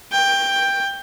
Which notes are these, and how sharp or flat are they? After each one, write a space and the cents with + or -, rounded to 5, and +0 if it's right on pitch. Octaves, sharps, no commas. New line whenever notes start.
G5 +10